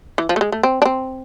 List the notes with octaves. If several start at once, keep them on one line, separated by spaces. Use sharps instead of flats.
E3
F3
A3
G#3
A3
C4
D4
C4